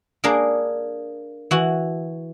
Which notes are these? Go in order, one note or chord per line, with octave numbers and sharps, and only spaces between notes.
A#3 D4 G#4 A#4
E3 F#4